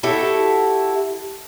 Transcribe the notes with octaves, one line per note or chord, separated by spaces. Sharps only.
E4 F#4 G4 A4